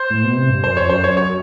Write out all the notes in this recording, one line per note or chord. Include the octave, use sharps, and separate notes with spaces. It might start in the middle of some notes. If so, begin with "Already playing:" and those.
Already playing: C5
A2
B2
C3
G2
F#2 C5
F2 C#5
F#2 C5
C#5
C#5